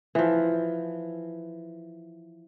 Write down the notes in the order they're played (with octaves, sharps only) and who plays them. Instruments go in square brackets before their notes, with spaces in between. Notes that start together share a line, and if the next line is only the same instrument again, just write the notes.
[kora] E3 F3